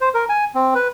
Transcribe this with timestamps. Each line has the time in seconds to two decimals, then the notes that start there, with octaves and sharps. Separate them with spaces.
0.01 C5
0.14 A#4
0.29 G#5
0.55 C4
0.75 B4